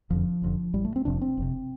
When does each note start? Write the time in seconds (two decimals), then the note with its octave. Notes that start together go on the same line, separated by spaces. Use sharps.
0.10 F1 F2 D3 F3
0.42 F1 F2 D3
0.73 A1 A2 G3
0.85 A3
0.96 C4
1.05 F1 F2 C3 D4
1.21 C4
1.37 F1 F2 C3